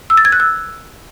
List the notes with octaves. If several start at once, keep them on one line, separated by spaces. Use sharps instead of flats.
E6
A6
G#6
F#6
E6